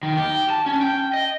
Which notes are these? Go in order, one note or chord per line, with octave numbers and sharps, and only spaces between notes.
D#3
G4
A5
C#4
G5
D#5